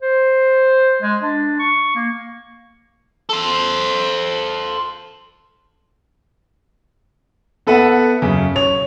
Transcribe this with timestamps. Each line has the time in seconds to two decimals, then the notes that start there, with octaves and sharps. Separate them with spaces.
0.02 C5
1.02 G#3
1.22 D4
1.59 C#6
1.96 A#3
3.29 A4 C5
7.67 B3 A4 B4 E5 F#5
8.22 F#2 C#3
8.56 C#5 F7